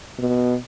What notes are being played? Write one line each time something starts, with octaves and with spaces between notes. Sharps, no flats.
B2